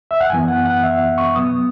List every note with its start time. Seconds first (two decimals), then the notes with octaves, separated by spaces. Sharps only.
0.11 E5
0.20 F#5
0.30 F#2 G#5
0.33 E3 B3
0.48 F#5
0.65 F#5
0.83 E5
1.18 C#6
1.36 B2 F#3 B3 D#6